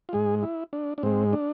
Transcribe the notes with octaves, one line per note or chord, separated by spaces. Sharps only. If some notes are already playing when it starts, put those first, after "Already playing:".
F4
G#2 G#3 G#4
E4
D4
D4
G#2 G#3 C4
D4